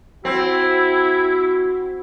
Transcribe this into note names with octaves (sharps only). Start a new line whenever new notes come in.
C4 E4 F#4